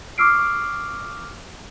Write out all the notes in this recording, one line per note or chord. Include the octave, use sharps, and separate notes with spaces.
C#6 D6 E6 F6 C7 D7